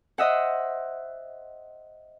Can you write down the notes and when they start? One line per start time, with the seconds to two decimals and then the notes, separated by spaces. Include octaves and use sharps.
0.18 C5 D#5 E5 F#5